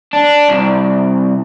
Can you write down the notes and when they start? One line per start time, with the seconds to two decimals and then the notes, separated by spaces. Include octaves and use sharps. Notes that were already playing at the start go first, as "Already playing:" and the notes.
0.13 D4
0.49 C2